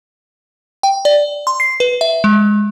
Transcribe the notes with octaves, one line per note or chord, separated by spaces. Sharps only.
G5
D5
C6
C7
B4
E5
G#3